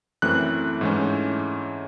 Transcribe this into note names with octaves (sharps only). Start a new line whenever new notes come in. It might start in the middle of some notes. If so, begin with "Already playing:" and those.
F#2 E3 A3 C4 F#6
G#2 E3 A3 C#4